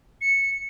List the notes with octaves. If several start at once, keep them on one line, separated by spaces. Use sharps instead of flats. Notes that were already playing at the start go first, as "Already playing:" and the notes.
C#7